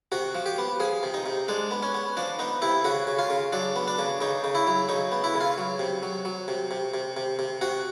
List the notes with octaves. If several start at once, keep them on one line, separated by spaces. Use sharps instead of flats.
C3 F#4
F3
G4
B3
F3 G#4
C3
D#4
C3
G#3 D4
B3
C#4
B3
F3 D4
B3 D#4
C3 E4
C#3 F#4
C#3
F4
C#3
F#3 D4
B3
D4
C#3
C#3 D#4
C#3
E4
F#3
C#3 D#4
B3
E4
C#3
F4
F#3
C3
F#3
F#3
C3
C3
C3
C3
C3
C3 F#4